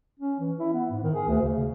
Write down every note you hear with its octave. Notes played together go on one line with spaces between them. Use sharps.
C#4
E3
E4
B3
G#2
D#3
G#4
D2
C#3
C#3